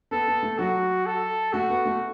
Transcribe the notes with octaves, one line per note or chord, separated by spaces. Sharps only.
B3 A4
B3
A3
F#3 F#4
A4
A3 F#4
B3
A3